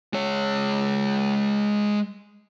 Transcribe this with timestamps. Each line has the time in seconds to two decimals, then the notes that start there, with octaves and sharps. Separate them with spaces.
0.13 G#3 C#5